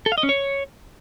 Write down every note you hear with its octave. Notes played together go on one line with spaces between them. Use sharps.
A4
F5
D#5
C#4
C#5